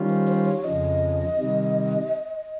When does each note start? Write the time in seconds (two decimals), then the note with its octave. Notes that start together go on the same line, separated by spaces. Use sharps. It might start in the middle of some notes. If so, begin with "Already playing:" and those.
Already playing: D#3 G3 C#4 F4
0.10 C5
0.28 C5
0.46 C#5
0.64 F2 C#3 F3 D#5
1.38 C3 D#3 G3